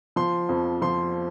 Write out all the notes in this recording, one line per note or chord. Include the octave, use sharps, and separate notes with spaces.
F3 C6
F2
F3 C6